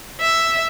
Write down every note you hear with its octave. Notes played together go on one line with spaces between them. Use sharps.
E5